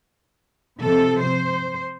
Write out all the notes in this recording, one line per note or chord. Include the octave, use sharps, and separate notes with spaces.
C3 F3 A4
C5